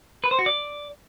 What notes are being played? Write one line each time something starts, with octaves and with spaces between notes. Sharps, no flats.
B4
C5
F#4
D5